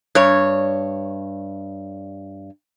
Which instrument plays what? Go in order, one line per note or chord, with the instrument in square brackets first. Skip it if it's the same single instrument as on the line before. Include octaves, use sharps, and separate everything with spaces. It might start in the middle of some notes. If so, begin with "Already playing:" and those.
[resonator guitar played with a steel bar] G2 C#5